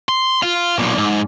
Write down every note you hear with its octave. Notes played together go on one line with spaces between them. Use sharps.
C6
F4
B1 A#2
G#2